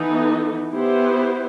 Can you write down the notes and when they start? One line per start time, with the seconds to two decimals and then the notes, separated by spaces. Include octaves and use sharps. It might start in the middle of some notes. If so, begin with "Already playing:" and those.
Already playing: E3 B3 D#4 A4
0.73 B3 E4 G4 C5